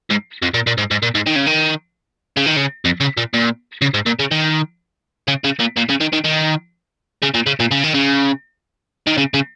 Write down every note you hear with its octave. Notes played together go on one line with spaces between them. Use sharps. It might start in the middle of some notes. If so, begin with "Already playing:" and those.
G#2
F2
A#2
A#2
G#2
G#2
A#2
G#2
D#3
C#3
D#3
C#3
D#3
C#3
F2
C#3
A#2
A#2
C#3
G#2
A#2
C#3
D#3
C#3
C#3
A#2
A#2
C#3
D#3
D#3
D#3
C#3
A#2
C#3
A#2
C#3
D#3
C#3
D#3
C#3
C#3